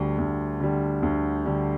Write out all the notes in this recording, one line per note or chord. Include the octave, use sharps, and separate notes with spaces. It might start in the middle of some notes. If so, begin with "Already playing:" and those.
Already playing: D2 D3 G3
D2
D3 G3
D2
D3 G3